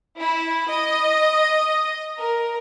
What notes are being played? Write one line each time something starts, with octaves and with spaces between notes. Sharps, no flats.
E4
D#5
A#4